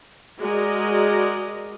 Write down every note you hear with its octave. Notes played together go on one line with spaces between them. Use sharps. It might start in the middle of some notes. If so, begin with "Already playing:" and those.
G#3 F#4 A#4 D5 D#5